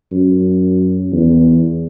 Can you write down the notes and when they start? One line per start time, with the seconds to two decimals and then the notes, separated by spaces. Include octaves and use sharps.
0.12 F#2
1.12 E2